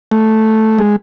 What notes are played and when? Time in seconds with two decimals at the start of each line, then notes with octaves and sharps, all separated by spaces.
0.11 A3
0.78 G#3